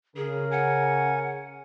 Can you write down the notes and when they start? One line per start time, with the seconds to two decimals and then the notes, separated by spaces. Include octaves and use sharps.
0.16 C#3 G#4 A#4
0.51 F#5 G#5